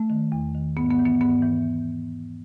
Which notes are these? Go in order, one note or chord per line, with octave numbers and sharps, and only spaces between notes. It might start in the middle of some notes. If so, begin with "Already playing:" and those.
Already playing: A3
D#3
E2
D#3
G#2 B3
B3
E3
B3
G#2 B3
E3